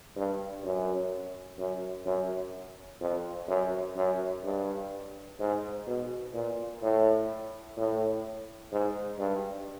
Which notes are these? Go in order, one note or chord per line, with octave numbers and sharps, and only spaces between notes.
G2
F#2
F#2
F#2
F2
F#2
F#2
G2
G#2
B2
A#2
A2
A2
G#2
G2